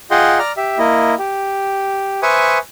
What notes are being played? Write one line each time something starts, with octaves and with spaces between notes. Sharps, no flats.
F4 G#4 D#5 F#5 G5 C6
D5 A#5 F6
G4 E5
A#3 E4 D#5
G4
B4 C5 E5 G#5 C#6 D#6